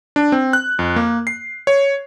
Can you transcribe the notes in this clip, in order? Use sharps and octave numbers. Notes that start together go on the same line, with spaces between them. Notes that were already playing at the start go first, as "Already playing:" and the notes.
D4
C4
F#6
F2
A#3
C7
C#5